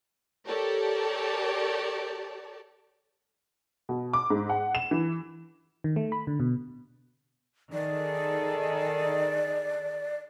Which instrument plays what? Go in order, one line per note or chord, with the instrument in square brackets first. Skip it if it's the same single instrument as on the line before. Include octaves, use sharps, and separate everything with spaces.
[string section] G4 A4 A#4 C#5 D5 A5
[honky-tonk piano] B2
D6
G#2
F#5
E7
E3
[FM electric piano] D#3
A3
B5
D3
B2
[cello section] D#3 G#4 A4 [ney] D5